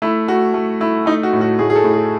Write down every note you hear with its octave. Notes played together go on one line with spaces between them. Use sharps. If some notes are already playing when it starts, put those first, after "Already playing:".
A3 E4
A3 F#4
A3
A3 E4
A3 D#4
F#4
A2
F#4
A2 G#4
G#4
A4
A2
G#4